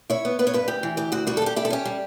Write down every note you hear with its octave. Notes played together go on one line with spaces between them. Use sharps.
E4 C#5
B3
B3 B4
C#5
G2 B4
D2 G4
E3
D2 G4
D2 F#4
G3 F#4
A4
G3 G4
E4 G4
A4
C#4 G4
G3